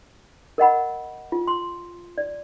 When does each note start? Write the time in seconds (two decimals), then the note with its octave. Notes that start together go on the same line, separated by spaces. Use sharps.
0.58 A#4 D#5 F#5 B5
1.32 F4
1.47 C6
2.18 D5